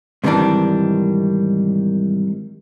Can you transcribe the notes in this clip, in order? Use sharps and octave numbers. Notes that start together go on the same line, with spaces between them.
G#2 C3 D#3 E3 G3 D4